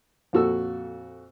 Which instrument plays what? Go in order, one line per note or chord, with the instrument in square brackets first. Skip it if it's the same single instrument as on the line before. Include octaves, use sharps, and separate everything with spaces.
[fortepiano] F2 A#2 F#4 A4 E6